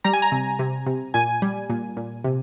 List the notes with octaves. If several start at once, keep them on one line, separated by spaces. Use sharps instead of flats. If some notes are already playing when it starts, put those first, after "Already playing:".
G3 A#5
G#5
A#5
C3
C3
C3
A#2 G#5
G3
A#2
A#2
C3